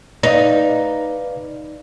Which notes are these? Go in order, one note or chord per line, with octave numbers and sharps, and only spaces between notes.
D#4 B4 D5 F5